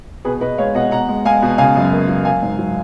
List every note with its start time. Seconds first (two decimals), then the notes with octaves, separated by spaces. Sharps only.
0.25 B2 G#4 B4
0.41 B2 B4 D#5
0.58 G#3 C#5 F5
0.75 B2 D#5 F#5
0.91 B2 F#5 A#5
1.09 G#3
1.25 G#3 F5 G#5
1.42 B2
1.58 C#3 F5 G#5
1.76 F#2
1.92 A#3
2.09 F#3
2.25 A#3 F5 G#5
2.42 G#2
2.58 F#3